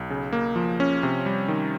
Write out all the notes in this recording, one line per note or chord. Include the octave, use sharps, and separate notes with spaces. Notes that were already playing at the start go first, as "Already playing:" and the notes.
Already playing: B1
C#3
A#3
F3
C#4
C3
G3
D#3